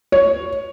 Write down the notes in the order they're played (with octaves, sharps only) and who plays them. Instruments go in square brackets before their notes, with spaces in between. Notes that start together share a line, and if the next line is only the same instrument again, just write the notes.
[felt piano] C#5